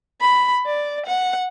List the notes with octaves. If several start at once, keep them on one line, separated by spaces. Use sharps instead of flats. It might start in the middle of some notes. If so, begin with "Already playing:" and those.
B5
D5
F#5